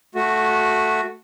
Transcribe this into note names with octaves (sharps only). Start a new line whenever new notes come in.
A3 F#4